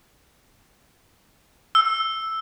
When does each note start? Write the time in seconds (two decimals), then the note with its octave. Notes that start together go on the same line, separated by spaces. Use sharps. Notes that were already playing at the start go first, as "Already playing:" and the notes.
1.75 E6